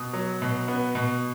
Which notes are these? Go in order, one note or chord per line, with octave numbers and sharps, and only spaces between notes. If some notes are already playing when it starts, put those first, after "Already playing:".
Already playing: B2 D#6
F#3
B2
B3
B2